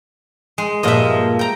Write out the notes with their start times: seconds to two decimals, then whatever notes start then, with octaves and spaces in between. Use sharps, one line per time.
0.58 G#3
0.83 G2 A#2 F3 D#5 E5
1.39 G5 A#5